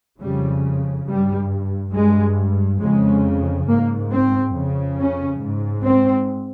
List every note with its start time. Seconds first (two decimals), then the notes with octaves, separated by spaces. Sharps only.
0.20 F2 C#3 G3
1.06 G2 G3
1.93 G2 G#3
2.80 F2 C#3 G#3
3.67 G#2 A#3
4.11 C4
4.54 F2 C#3
4.97 C#4
5.41 G#2
5.85 C4